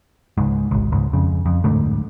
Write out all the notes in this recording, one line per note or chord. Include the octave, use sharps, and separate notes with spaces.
C#2 G#2
G#1 C#2
C#2 G#2
F2 C#3
F2
D1 G#2 D3 A3